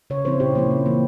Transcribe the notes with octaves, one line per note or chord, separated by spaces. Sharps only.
C#3 C#5
F3 C4 E4 C5
A#2 G4
F3 A#3 C#4 E4
C#3
E3 A#3